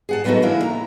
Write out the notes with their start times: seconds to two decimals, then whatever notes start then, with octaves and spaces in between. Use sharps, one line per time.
0.09 G#4 F#5 A5
0.24 F#3 A3 B3 D4 D#4 F#4
0.42 D3 E3 A#3 E4
0.63 A#5